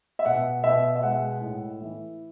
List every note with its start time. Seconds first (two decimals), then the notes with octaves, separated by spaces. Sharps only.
0.19 E5
0.25 B2 F#5
0.64 B2 E5
0.95 E5
1.03 G#3 F#5
1.41 A2
1.81 E3